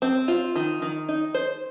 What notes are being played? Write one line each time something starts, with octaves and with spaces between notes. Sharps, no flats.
C4
F4
D#3
D#3
D#4
C5